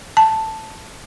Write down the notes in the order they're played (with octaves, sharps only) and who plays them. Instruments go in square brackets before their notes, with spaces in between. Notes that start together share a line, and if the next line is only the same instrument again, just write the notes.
[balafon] A5